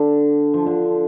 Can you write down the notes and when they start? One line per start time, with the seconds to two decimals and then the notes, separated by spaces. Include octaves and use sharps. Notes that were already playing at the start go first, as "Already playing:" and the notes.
Already playing: D3
0.54 F3
0.66 D3